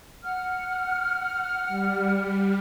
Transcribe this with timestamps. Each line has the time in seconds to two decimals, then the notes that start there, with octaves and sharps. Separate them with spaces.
0.23 F#5 F6
1.68 G3